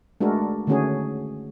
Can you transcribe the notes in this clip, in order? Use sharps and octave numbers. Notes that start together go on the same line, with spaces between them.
G#3 A3 D4 F#4 A4 A#4
D3 D#3 A3 C#4 F#4 G#4